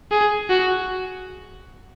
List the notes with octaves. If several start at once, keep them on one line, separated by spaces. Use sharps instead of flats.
G#4
F#4